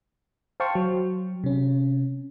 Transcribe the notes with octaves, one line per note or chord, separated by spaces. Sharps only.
C5 F5 G5 A5 C6 C#6
F#3
C3 C#4